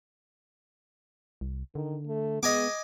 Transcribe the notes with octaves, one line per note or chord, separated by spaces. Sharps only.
C2
D3 D#3
A3
G#3 B3 D#5 G#5 D6